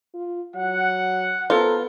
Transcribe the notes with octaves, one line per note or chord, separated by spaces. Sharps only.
F4
F#3 F#5
B3 F4 A4 C5 A#5